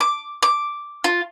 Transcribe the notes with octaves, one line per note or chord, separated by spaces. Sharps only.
D6
D6
F4